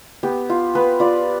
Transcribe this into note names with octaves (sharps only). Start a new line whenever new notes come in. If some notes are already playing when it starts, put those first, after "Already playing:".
B3 G4
F4
B3 B4
F4 D5